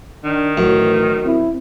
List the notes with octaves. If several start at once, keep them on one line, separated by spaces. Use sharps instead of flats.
D#3 D4
F#2 A2 E3
C4 E4